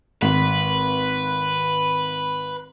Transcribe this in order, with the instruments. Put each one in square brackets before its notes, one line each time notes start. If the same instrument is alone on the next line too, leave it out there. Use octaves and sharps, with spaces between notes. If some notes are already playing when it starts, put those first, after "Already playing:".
[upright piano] G#1 [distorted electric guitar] B4